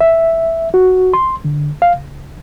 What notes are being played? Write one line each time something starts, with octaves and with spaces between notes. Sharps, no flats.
E5
F#4
C6
D3
F5
C#2